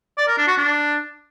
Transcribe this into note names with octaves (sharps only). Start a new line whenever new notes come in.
D5
A#4
D4
F#4
D4